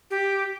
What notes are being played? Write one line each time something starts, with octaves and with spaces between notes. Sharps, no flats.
G4